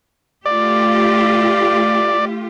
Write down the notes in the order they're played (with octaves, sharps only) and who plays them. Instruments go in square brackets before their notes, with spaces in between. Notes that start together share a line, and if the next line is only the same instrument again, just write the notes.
[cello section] A3 F4 G4 [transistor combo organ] D5